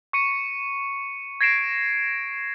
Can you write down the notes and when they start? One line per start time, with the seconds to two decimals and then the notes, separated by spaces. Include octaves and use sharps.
0.13 C#6 C#7 D#7
1.41 G#6 A#6 C7 D7 E7